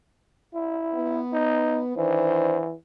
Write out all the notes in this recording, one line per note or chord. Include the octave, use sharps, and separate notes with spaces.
E4
B3
D#4
D#3 E3 D4 C5